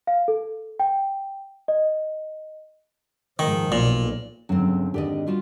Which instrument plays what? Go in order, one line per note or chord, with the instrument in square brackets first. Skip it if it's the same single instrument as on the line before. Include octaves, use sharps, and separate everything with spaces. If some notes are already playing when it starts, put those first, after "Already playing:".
[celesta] F5
A4
G5
D#5
[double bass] G#2 F3 [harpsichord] D#3
[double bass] B1 [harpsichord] A#2
[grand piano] G1 C#2 [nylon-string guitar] F#3 C4
[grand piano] G#1 D3 [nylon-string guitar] G4 D5 D#5
[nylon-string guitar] G3 F4 F#4